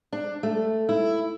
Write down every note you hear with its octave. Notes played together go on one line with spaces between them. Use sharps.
D4
A3
E4